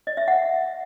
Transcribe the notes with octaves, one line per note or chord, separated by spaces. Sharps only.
D#5
E5
F#5